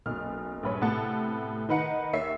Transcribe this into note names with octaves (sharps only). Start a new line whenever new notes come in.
F#1 B1 B2 F6
A#1 G2 B4 C#5
A2 C3 B3 F#5 A5
D#3 D#4 B4 F#5 A#5 C#7
D#2 C#5 E5 C7